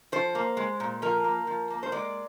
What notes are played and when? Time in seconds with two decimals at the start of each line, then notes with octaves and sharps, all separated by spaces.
0.12 F3 C5
0.35 A#3
0.57 G#3
0.80 A#2
1.02 F3 A#4
1.24 A#3
1.47 F3
1.70 A#3
1.83 C5
1.92 G#3 D5